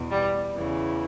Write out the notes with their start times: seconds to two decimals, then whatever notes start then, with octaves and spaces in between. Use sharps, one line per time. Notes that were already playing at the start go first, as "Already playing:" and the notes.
Already playing: E2 B2
0.12 G3
0.55 E2 C#3 E3